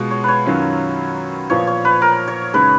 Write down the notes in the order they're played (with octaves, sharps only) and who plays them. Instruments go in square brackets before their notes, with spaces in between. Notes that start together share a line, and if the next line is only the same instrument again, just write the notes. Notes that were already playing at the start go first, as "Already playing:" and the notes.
Already playing: [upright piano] B2 G#3 F4
[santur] C#5
B4 C#5
[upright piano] F#2 D#3 F#3 C#4 F4
[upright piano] A#2 F3 B3 F4 [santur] C#5
[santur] C#5
B4
A#4
C#5
[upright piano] F#2 C#3 G#3 D#4 [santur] B4